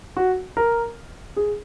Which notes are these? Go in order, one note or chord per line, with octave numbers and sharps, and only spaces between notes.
F#4
A#4
G#4